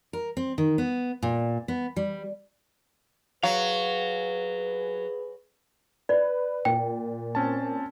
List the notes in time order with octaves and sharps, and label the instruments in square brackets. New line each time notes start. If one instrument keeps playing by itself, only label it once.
[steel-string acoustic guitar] A#4
C4
D#3
B3
A#2
B3
G3
[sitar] F#3 [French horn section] G#4 B4 [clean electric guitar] F5
[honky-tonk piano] B4 [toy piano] D5
[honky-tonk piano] A#2 [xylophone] G5
[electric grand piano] C4 C#4 A5